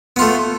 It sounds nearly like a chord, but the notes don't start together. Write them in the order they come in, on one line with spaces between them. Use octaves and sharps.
B3 F4 A3